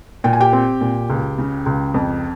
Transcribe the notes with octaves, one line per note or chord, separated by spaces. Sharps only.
A#2 G5
G#5
G4 G5
C4
A#2
C#2
C#3
C#2
F2